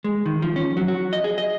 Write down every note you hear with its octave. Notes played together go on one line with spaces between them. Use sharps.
G#3
D#3
F3
C#4
F#3
F#4
D#5
G#4
D#5